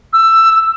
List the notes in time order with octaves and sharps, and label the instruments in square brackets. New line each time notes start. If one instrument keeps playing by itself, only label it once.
[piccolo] E6